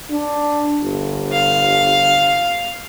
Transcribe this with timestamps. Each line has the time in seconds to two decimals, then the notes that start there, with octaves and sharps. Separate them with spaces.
0.11 D4
0.83 G1
1.32 F5